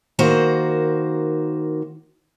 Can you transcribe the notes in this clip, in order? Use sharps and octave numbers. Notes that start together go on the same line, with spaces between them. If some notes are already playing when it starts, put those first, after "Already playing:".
D#3 A#3 F#4 C5